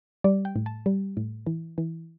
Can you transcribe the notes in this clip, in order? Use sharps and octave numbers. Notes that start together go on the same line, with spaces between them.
G3 D5
G5
A2
A5
G3
A2
E3
E3